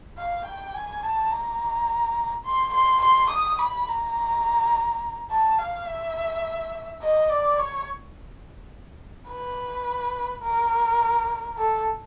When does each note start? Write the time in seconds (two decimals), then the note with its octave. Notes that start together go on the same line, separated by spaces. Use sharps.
0.18 F5
0.46 G5
0.74 G#5
1.03 A5
1.31 A#5
2.45 C6
2.74 C6
3.02 C6
3.30 D#6
3.59 B5
3.88 A#5
5.30 A5
5.59 F5
5.87 E5
7.02 D#5
7.30 D5
7.58 C#5
9.30 B4
10.43 A#4
11.58 A4